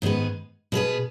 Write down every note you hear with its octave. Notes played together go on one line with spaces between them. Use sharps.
G#2 D#3 B3 G#4 B4
B2 B3 G#4 B4